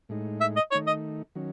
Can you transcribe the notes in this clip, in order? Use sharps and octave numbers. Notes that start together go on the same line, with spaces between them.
A2 G#3 D#4
E5
D#5
D#3 A3 D#4 C#5
D#5
D#3 F#3 C#4